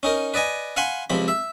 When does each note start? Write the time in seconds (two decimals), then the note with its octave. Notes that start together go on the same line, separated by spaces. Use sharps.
0.03 C#4 D#4 A#4
0.34 B4 D5 D#5 G#5
0.76 F5 F#5 G#5 B5 C6
1.10 C#2 C3 F3 B5
1.28 E5